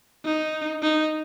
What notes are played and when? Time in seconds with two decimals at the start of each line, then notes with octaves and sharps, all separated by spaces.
0.25 D#4
0.83 D#4